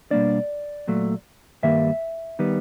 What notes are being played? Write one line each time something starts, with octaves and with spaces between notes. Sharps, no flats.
B2 G3 A#3 D4 D5
A#2 F#3 A3
G2 D#3 G3 A#3 E5
D#3 G3 B3